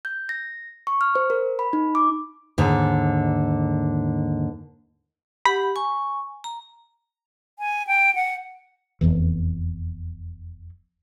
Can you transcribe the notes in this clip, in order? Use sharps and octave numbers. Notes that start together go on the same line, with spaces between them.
G6
A#6
C#6
F6
C5
A#4
B5
D#4
D6
D#2 G#2 D3
G4 F#5 B5
G#5 C#6
A#5
G#5
G5
F#5
F1 B1 E2 E3